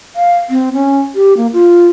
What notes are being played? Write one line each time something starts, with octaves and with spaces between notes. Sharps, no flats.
F5
C4
C#4
G4
A#3
F4